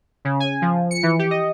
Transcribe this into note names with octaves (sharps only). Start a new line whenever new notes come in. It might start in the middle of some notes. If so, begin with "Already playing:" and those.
C#3
G#5
F3
C#7
E3
G4
D#5